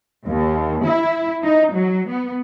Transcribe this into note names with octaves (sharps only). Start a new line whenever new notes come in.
D#2
E4
D#4
F#3
B3